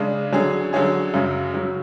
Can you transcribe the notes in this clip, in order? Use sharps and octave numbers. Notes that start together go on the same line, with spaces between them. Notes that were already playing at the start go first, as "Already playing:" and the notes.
Already playing: C#3 G#3 D4
D3 F#3 C#4 G#4
D3 F#3 C#4 G#4
F#2 C#3 F#3 C#4
C#3 F#3 C#4